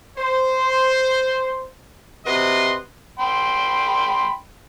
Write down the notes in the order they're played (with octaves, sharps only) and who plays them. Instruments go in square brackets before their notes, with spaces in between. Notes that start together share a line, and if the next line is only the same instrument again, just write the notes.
[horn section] C5
C3 F#4 B4 D#5 C6
[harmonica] G5 B5 C6